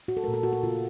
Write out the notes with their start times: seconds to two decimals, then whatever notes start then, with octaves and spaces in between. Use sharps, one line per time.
0.08 F#4
0.17 A4
0.24 A#2 A3 A#4
0.34 A4
0.43 F#4
0.53 A4
0.63 C#3 F3 A#3 F4